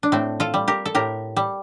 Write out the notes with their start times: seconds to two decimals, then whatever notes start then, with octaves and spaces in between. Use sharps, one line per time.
0.03 D4
0.12 A2 A3 C4
0.40 F4 A4
0.54 G3
0.68 G4 A#4
0.86 A4
0.95 A2 G4 A#4
1.36 G3